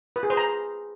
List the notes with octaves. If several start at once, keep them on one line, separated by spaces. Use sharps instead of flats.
B4
G#4
C5
A#5